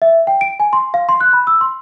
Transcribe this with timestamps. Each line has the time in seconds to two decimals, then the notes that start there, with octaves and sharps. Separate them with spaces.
0.02 E5
0.27 G5
0.41 D7
0.60 G#5
0.73 C6
0.94 F5
1.09 C6
1.21 F#6
1.33 B5
1.47 E6
1.61 C6